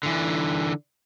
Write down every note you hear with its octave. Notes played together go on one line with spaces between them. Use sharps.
D3 E3